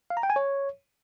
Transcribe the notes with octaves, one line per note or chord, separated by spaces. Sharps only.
F5
A#5
G5
G#5
C#5